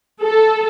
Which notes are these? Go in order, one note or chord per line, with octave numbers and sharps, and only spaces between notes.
A4